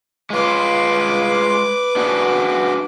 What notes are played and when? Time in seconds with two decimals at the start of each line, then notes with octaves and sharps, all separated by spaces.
0.30 G#3 F4 B4 D6
1.96 D4 F#4 G#4